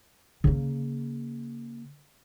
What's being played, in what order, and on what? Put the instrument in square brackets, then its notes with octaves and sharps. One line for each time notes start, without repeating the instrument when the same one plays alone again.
[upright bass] C#3 A#3